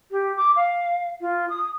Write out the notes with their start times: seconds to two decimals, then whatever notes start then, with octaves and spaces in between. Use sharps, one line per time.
0.11 G4
0.37 D6
0.56 F5
1.21 F4
1.50 D#6